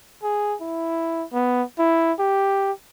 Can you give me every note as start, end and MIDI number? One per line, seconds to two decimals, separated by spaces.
0.23 0.55 68
0.61 1.25 64
1.33 1.63 59
1.79 2.13 64
2.19 2.72 67